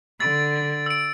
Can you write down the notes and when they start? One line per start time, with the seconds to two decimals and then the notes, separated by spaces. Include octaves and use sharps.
0.20 D3 E6 A6 D7
0.86 E6 A6 D7